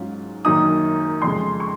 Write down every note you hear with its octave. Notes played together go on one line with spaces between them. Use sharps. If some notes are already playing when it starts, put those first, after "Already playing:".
Already playing: G#2 F#3 C#4 F4
F#2 D#3 F#3 A#3 D#4 D#6
F2 C#3 G#3 C6
C#6